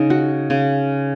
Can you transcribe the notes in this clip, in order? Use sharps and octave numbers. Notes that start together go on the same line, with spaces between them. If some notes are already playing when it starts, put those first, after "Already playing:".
Already playing: C#3 D#4
F#4
C#3